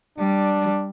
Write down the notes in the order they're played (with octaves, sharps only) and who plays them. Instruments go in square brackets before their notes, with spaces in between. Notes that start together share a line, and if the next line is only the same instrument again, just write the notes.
[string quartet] G3 [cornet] D4